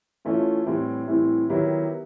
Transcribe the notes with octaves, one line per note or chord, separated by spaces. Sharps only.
E3 A3 C#4 F4
A2 E3 G3 C4
A2 E3 G3 C4
D#3 F#3 B3 E4 G4